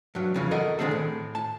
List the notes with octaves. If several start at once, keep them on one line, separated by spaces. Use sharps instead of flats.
G2 F#3
F2 C#3 E3
A4 A#4 D#5 F#5
D3 D#3 C4 G#4 A4
A2
A5